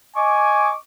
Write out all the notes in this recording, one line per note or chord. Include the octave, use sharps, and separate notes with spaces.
D#5 G#5 C#6 D6